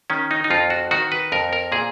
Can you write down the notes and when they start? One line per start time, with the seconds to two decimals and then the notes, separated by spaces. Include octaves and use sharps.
0.10 D#3 C#4
0.31 D#4
0.44 D#4
0.50 F2 F4
0.70 F#4
0.91 D#3 F#4
1.12 B4
1.32 F2 A#4
1.53 A#4
1.72 A#2 G#4